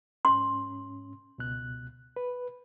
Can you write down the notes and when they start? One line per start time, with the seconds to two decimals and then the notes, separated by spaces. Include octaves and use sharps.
0.25 G#2 C#4 C6
1.38 C#2 B2 F#6
2.16 B4